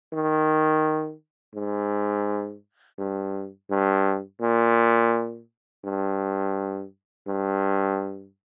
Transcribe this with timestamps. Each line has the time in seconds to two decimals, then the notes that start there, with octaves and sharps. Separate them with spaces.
0.13 D#3
1.55 G#2
2.99 G2
3.71 G2
4.41 A#2
5.84 G2
7.27 G2